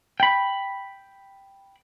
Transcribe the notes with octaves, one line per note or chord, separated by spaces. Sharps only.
G5 B5